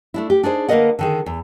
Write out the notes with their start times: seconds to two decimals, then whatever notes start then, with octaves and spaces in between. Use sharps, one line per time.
0.14 A3 D4 E4
0.30 G4
0.43 D4 D#4 G#4 C5
0.69 D3 A#3 A#4 B4 D#5 F#5
0.99 D3 D#3 G#4
1.26 E2